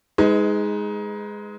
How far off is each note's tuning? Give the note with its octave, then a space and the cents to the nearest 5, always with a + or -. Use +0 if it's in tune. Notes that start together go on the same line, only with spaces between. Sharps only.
G#3 +0 D#4 +25 B4 +30